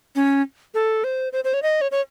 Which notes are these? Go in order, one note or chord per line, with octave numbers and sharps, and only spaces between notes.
C#4
A4
C5
C5
C5
C#5
D#5
C#5
C#5